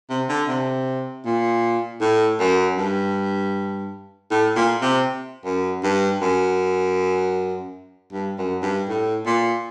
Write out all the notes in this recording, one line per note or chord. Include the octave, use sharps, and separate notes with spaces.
C3
D3
C3
A#2
A2
F#2
G2
A2
A#2
C3
F#2
G2
F#2
G2
F#2
G2
A2
A#2